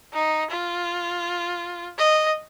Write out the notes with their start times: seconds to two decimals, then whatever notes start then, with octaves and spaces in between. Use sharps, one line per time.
0.13 D#4
0.51 F4
1.98 D#5